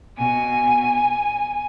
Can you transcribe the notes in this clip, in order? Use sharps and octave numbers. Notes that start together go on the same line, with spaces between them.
B2 G#5